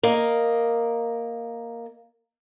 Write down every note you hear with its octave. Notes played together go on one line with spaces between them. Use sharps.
A#3 D#5